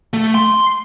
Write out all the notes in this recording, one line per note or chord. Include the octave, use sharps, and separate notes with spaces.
A3
C6